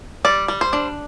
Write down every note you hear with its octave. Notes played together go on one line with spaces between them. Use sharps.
G3 D5
G3
C5
D4